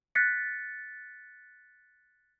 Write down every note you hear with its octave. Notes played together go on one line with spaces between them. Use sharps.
F#6 A6 B6 C#7